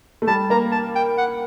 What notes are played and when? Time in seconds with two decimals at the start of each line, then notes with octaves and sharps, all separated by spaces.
0.22 A3
0.27 G3 A5
0.50 A#3 A#5
0.72 A5
0.95 G5
1.18 F#5